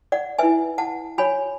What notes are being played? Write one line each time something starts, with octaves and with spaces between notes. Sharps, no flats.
D5 F#5
E4 B4 E5 G#5
F#5 A5
F#4 C#5 G#5 B5